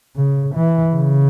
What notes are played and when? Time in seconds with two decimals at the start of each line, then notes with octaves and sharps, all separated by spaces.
0.16 C#3
0.55 E3
0.95 C#3